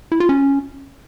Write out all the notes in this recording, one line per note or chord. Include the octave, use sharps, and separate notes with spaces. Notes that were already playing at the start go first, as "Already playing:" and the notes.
E4
F4
C#4